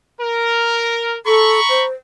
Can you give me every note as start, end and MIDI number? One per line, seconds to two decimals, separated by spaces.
0.21 1.17 70
1.26 1.60 69
1.26 1.85 82
1.26 1.85 83
1.26 1.85 85
1.69 1.92 72